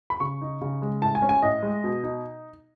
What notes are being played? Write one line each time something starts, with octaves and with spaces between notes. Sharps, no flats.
B5
C#3 C#6
D#4
C#3
G#3
A2 A5
G#5
C#4
G#5
A2 D#5
G#3
B2
D#4